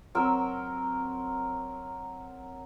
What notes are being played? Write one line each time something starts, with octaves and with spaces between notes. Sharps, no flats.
F#3 C4 A#4 E6